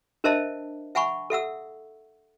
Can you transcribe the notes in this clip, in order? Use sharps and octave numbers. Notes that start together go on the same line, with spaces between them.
D4 A#4 C5 D#5 E5 A5
E5 F#5 G#5 B5 C#6
A4 E5 F#5 E6